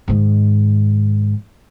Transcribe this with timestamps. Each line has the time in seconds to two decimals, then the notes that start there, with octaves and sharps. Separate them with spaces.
0.08 G#2 D#3